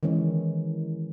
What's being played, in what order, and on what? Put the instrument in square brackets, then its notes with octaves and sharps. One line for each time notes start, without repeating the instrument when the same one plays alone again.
[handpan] D#3 E3 G#3 C#4